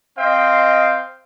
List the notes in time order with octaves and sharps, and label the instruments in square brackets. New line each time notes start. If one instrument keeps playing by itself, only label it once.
[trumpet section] C4 C5 D#5 F5 G5